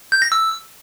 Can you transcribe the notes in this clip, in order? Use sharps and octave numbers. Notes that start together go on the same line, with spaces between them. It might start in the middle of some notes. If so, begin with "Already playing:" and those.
G6
A#6
E6